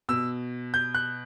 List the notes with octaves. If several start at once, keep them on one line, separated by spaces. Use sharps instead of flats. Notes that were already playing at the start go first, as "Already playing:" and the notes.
B2 E6
G6
F#6